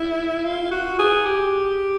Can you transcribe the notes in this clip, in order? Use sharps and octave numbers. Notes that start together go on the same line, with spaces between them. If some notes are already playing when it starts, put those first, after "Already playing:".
Already playing: E4
F4
F#4
G#4
G4